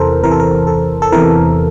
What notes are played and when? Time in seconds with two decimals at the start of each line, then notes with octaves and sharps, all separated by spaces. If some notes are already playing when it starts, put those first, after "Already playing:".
Already playing: E2 C3 E3 A4 A#4 C5
0.23 E2 C3 E3 A#4
0.31 A4
0.40 A#4
0.67 A4
1.02 A4
1.12 E2 C3 E3 A#4